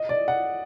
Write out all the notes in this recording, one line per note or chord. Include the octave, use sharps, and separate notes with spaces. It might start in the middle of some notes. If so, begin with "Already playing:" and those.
Already playing: D#5
D5
F#5